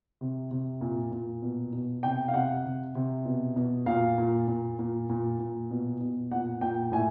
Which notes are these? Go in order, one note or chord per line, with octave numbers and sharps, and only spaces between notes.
C3
C3
A#2
A#2
B2
B2
C3 G5
F5
C3 F#5
C3
C3
B2
B2
A#2 F5
A#2
A#2
A#2
A#2
A#2
B2
B2
A#2 F#5
A#2 G5
A2 G#5